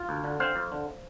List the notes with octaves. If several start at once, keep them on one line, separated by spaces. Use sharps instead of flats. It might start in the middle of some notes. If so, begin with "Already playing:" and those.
Already playing: F4
D2
D3
C4 C5 F5
F2
D3